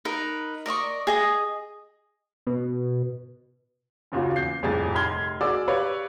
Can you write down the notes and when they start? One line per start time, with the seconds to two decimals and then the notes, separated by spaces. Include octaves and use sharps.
0.05 D#4 A#4 B4
0.66 A#4 D5 D#5 C#6
1.07 G#4 D#5 D#6
2.47 B2
4.12 F#1 D#2 C#3 F4 F#4
4.36 E2 G6 C7
4.63 D#1 C2 F2 A2 G#4 A6
4.95 F1 B5 C6 F6 G#6 G7
5.41 F#4 G#4 A#4 D5 D6 E6
5.68 G4 B4 C#5 D5 F5 C#6